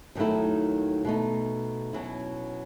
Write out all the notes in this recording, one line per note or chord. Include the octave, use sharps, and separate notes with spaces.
D#2 D#3 F#3 A3 E4
B2 A3 D#4
B2 F#3 C#4 E4